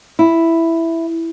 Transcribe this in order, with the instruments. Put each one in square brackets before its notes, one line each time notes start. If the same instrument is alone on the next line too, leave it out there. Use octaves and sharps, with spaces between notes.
[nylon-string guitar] E4